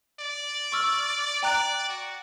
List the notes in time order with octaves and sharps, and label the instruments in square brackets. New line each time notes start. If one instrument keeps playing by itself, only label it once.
[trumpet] D5
[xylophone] C#6 E6 F6
[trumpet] D5 [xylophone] G5 A#5 F#6
[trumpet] F#4